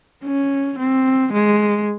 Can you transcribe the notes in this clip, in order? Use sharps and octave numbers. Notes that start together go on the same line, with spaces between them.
C#4
C4
G#3